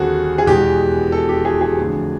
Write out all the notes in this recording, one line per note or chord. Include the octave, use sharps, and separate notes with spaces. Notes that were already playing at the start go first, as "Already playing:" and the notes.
Already playing: D#2 D3 G3 C4 F#4 G#4 A4
G#4
E2 B2 G#3 G4
A4
G4
G#4
G#4
F2 D3 F#3 A3